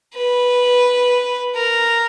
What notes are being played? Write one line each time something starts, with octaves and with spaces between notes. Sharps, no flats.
B4
A#4